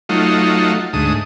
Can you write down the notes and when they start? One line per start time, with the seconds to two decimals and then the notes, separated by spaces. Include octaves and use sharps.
0.09 F#3 A3 D#4 F4
0.93 D2 G#2 A3 D#6